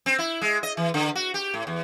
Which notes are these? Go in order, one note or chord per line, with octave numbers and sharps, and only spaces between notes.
C4
E4
G#3
D#5
E3
D3
F#4
G4
A2
E2